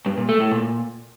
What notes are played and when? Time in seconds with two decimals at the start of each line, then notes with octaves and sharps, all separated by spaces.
0.06 G2
0.17 A#2
0.29 A3
0.40 A2
0.51 A#2